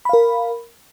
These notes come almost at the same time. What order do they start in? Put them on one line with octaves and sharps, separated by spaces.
B5 F5 A#4